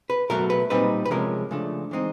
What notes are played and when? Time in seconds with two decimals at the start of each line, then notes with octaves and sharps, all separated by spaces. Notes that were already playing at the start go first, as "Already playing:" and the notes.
0.10 B4
0.30 B2 F#3 A3 A#4
0.50 B4
0.70 A#2 G3 C4 D#4 B4
1.05 B4
1.10 C3 F3 G#3 C#4 A#4
1.51 C#3 F3 A3 D4
1.91 E3 G#3 C4 D#4